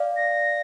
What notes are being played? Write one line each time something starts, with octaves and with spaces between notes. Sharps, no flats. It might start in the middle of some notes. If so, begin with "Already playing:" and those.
Already playing: D5 F5
A#6